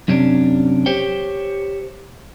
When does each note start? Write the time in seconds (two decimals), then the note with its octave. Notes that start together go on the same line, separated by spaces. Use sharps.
0.08 F#2 C3 C#4 D4
0.86 G4 C5 C#5 G5